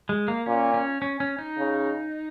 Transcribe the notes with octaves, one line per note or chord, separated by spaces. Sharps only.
G#3
A#3
A#2 C#4
C#4
C#4
C#4
D#4
C#3